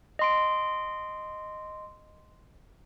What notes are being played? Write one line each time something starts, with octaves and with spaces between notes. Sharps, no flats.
D#5 C6 D7